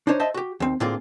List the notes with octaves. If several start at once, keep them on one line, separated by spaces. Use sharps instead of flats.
D4 D#4 C5 C#5
C5 D#5 E5 A5
F#4 G4
D#2 C4
A2 D3 A#3 C4 F4 G#4